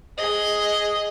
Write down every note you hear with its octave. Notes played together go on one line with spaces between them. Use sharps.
G#4 D#5